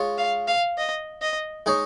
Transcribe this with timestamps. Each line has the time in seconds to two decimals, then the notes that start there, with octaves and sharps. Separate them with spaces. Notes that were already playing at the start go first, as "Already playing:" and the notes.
Already playing: G#3 F4 C#5
0.18 F5
0.48 F5
0.78 D#5
1.22 D#5
1.66 G#3 D#4 G#4 C#5